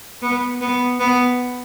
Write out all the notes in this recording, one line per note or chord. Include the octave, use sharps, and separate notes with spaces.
B3
B3
B3